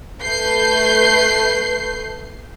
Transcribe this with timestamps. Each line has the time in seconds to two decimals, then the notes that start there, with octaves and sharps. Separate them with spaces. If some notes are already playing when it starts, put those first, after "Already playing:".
0.23 A3 B4 G6 C7